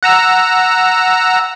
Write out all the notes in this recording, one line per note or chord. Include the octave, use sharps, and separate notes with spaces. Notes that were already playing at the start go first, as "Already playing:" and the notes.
F#5 A#5 E6